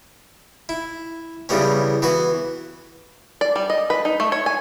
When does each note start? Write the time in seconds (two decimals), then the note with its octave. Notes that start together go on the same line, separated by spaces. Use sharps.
0.69 E4
1.49 E2 C#3 E3 G3 B3 C#4
2.02 E3 B3 F#4 B4
3.41 D5
3.56 G3
3.70 D#5
3.90 B4
4.05 D#4
4.20 A3
4.32 C#5
4.46 G#5